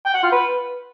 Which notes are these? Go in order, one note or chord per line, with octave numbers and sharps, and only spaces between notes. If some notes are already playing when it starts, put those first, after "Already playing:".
G5
F#5
F4
B4